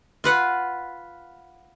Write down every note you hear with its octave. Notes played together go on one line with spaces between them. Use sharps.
F4 B4 F#5